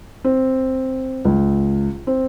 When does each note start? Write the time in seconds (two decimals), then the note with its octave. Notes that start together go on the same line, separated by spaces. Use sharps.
0.24 C4
1.25 C#2
2.07 C4